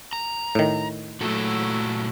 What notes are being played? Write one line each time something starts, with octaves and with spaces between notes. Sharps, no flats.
A#5
A2 D#3
A#2 F#3 A3 E4 F#4 A4